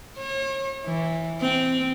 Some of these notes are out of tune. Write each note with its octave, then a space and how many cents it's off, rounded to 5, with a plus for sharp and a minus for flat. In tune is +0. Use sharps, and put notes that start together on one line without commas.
C#5 -40
E3 -5
C4 -10